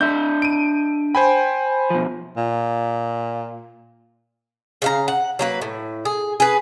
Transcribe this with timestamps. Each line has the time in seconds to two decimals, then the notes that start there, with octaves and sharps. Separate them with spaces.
0.01 D4 D#5 E5 G6
0.42 D7 D#7
1.15 C5 G5 G#5 B5
1.90 B2 F3
2.37 A#2
4.82 C#3 F5 A#5
5.08 F#5
5.39 F#3 A#3 B4
5.62 A2
6.05 G#4
6.40 G#4 B4